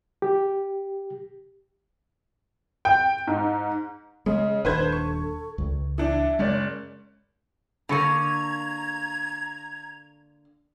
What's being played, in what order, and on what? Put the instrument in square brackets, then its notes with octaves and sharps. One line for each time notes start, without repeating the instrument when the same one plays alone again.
[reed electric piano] G4
[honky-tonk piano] G5
G#2
[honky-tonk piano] C#3 [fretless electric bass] G#3 [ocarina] D#5
[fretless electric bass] D#1 D#2 D4 [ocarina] A4 [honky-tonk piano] B4 C5 G#6
[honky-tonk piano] C#6
[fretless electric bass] C#2
[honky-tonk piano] E3 D4 [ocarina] E5
[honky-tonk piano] F#1 C#4 D5 [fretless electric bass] G#3
[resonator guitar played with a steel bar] D3 A#3 [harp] A5 C#6 D#7 [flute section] A#5 G#6